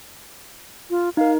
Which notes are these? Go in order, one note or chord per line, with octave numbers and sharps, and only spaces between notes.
F4
D#4 A#4 F5